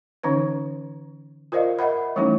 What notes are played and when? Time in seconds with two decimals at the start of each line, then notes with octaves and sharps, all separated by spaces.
0.23 D3 E3 C#4 D#4 B4
1.52 F4 A#4 C5 D5 D#5 F5
1.79 A#4 D#5 E5 F#5 B5
2.16 E3 G3 A3 C#4 D#4 E4